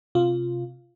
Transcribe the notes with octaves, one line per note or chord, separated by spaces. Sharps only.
C3 F4